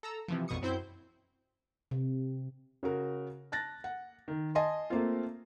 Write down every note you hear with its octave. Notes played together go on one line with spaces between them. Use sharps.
A4 A#5 E6
C3 E3 F3
A#1 F2 B2 C#6 D#6 C#7
F#2 C4 E4 C5 G6
C3
C#3 F#4 A#4
A5 F#6 A6 A#6
F#5
D#3
D#5 G#5 A5 C6
A3 A#3 C4 F4